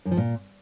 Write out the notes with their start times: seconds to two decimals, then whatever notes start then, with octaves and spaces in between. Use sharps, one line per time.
0.05 F#2
0.11 F3
0.17 A#2